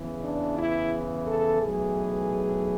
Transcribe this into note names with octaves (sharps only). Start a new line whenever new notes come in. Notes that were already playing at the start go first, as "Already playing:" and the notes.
Already playing: E2 C#3 E3
D4
E4
A4
B1 A2 E3 G#4